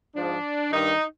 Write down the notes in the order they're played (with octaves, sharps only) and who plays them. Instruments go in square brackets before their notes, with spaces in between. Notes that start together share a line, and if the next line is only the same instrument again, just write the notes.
[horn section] G#2 F3 D4
G2 D#3 D#4